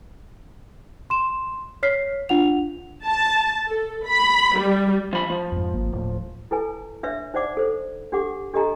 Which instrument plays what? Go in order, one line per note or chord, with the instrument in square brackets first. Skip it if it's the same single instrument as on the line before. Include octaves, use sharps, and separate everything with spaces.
[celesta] C6 E7
C#5 F6 B6 C7
D4 F4 F#5 F7
[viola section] A5
A4
B5
G3
[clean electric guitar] F3 B5
F3
[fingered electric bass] F2 G#2
G#1 A#3
D1 A2
[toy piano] E4 A4 B4 G#5 A5
D4 B4 C#5 E5
D#4 C5 D5 F#5 D6
A4 C5
D4 G4 A4 F#5 D6
D4 G4 A4 D#5 G#5 A#5